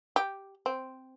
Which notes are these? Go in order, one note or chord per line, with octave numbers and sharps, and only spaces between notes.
G4
C4